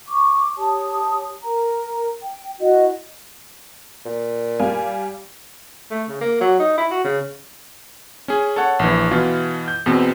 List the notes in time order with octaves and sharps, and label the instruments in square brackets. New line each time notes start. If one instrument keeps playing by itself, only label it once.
[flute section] C#6 D6
G4 C#5 A5 D#6
A#4 A#5
G5
E4 F#4 D#5
[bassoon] A#2
[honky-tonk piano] G3 F5 G#5
[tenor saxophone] A3
C#3
A#3
F#3
D#4
E4
F#4
C#3
[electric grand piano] C#4 G#4
A4 C#5 F#5
A#1 E3
B2 E3 F4
G6
E2 B2 C4